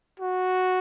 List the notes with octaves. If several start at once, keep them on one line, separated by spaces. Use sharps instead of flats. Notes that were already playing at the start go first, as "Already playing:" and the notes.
F#4